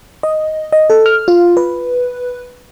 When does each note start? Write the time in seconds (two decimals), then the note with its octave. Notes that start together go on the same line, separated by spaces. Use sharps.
0.23 D#5
0.73 D#5
0.90 A4
1.06 F6
1.28 F4
1.57 B4